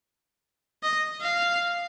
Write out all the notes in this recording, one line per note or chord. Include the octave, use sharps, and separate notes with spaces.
D#5
F5